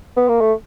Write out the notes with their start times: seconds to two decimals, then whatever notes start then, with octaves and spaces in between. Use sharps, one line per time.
0.17 B3
0.29 A#3
0.41 A3